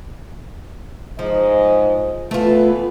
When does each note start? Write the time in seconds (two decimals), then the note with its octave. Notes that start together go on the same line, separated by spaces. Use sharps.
1.19 G#2 F3 D#5
2.31 E3 A3 B3 F4 B4